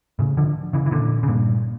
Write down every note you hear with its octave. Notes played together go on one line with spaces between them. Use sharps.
A2 C#3
D3 F3
C#3 E3
E3
A#2 D3
C#3
G2 A#2